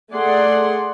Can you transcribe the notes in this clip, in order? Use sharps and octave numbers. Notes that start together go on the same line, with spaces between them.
A3 G#4 D5 F#5 C6